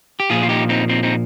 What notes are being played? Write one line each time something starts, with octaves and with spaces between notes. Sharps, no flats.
G4
A#2 F3 F4 G#4
F4
D#4 G4
C4 D#4
C4 D#4
C4 D#4